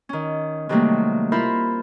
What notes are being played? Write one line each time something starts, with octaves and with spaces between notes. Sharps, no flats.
D#3 C#4
C3 D#3 F#3 G3 A3 A#3
E4 F4 A#4 C5 E5 B5